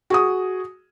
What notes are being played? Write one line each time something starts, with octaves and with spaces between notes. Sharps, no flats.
F#4 G#4 D#6